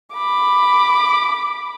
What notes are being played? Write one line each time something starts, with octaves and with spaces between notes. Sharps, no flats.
B5 D6